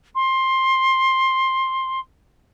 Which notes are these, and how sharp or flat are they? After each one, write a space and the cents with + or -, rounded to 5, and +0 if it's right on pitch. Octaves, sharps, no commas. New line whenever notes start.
C6 +15